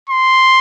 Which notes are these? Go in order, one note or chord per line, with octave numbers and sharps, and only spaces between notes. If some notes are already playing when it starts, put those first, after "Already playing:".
C6